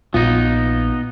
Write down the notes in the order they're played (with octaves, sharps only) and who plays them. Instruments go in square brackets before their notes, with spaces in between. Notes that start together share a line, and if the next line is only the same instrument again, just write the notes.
[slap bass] A#1 F3 [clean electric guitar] B3 D#4 [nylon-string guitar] F4